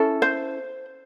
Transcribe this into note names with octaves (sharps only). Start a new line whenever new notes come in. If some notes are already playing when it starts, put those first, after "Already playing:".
Already playing: C#4 E4 A4
C5